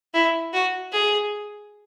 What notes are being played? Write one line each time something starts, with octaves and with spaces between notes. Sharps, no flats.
E4
F#4
G#4